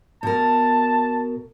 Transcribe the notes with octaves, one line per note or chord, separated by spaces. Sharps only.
B2 A#4 A5